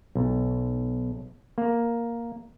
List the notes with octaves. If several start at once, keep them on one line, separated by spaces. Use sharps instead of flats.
B1
A#3